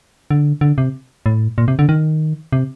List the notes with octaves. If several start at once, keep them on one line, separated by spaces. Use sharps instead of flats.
D3
D3
C3
A2
A#2
C3
D3
D#3
C3